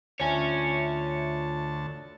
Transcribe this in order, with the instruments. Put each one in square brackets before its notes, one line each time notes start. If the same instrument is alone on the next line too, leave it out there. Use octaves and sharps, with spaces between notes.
[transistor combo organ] D2 A5 [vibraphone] F4 E5 [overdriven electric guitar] C#5 G#5